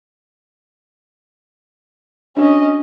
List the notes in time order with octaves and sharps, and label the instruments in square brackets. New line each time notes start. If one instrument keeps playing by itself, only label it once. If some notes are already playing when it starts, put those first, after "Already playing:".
[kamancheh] C#4 D#5 [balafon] D4 F#4